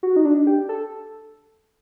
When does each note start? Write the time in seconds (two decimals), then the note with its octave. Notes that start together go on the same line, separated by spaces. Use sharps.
0.03 F#4
0.16 D#4
0.25 D4
0.47 G4
0.69 A4